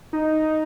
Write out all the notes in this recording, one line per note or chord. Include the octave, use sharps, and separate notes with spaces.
D#4